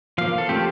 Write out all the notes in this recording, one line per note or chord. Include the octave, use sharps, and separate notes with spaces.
F3 A#3 F5
A4
F3 A3 C4 G4